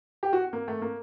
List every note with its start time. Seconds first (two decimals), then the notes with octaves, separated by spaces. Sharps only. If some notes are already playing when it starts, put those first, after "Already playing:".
0.23 G4
0.33 F#4
0.53 A#3
0.68 A3
0.82 A#3